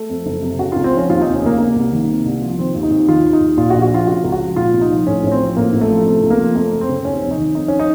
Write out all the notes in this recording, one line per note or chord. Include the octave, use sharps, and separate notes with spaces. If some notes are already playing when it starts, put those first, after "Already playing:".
Already playing: A3
F2
F#1
C3
C#3 F#4
C#2 F4
C4
F3 C#4
D#2 F4
F1 D#4
C#4
C#3 A#3
C3 A#3
C2
D#3
C3
C2
F3
D#3 C4
D#2
D#4
D#2
D#3 F4
D#2
D#4
D#2
A#2 F4
F#4
A#1
F#4
F3 F4
C#3 F#4
C#2
F#4
F3
A#2 F4
C2
D#4
F3
A2 C#4
A1 C#4
C4
F3
A2 A#3
A1
A3
F3
C3 A3
C#2
A#3
F3
F2 A3
F#1
C4
C#3
D#2 C#4
F1
D#4
D#3
F2 D#4
C#4
D#4